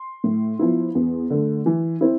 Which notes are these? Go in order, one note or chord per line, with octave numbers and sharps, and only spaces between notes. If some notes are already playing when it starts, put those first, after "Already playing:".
Already playing: C6
A2
F3 B3 E4
E2
D3 A3
E3
C4 E4